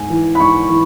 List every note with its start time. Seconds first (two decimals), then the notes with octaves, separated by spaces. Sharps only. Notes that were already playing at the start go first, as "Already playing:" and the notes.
Already playing: G#2 G#5
0.10 E3
0.35 B5
0.40 G#2 C#6
0.70 E3